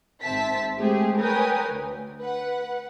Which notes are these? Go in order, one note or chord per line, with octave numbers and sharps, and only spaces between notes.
G#1 C4 E5 A5 B6
G#3 A3 C4 G4 G#4
A#4 B4 C#5 G5 G#5 D#6
D2
B4 F#5